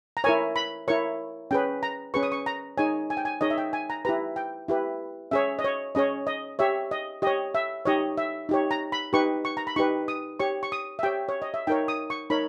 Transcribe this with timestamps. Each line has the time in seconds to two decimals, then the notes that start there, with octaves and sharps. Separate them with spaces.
0.17 A#5
0.24 E4 A#4 C#5 G#5
0.56 B5
0.88 E4 A#4 C#5 C#6
1.51 C#4 G#4 B4 G5
1.83 A#5
2.14 C#4 G#4 B4 C#6
2.23 D#6
2.32 C#6
2.46 A#5
2.77 D#4 G#4 C#5 G#5
3.10 G#5
3.17 G5
3.25 G#5
3.41 D#4 G#4 C#5 D#5
3.50 E5
3.58 G5
3.73 G#5
3.90 A#5
4.05 E4 G4 B4 A#5
4.36 G5
4.68 E4 G4 B4
5.31 C#4 G#4 C#5 E5
5.59 D#5
5.64 C#5
5.95 C#4 G#4 C#5 D#5
6.27 D#5
6.59 G4 C#5 E5
6.91 D#5
7.22 G4 C#5 D#5
7.55 E5
7.85 D#4 G4 C#5 D#5
8.18 E5
8.49 D#4 G4 C#5
8.71 A#5
8.92 B5
9.13 D#4 G4 B4 C#6
9.45 C#6
9.57 A#5
9.67 B5
9.76 D#4 G4 B4 C#6
10.08 D#6
10.40 G4 C#5 C#6
10.63 C#6
10.72 D#6
10.99 E5
11.03 G4 C#5 G5
11.29 C#5
11.42 D#5
11.54 E5
11.67 D#4 A#4 C#5 G5
11.88 D#6
12.10 C#6
12.30 D#4 A#4 C#5 B5